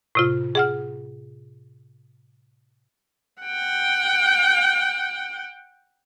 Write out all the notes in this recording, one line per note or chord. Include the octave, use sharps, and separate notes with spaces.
A2 C3 F4
G#4 F#5 F6
F#5 G5